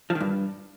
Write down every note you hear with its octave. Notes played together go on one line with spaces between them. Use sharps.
F3
D#3
G2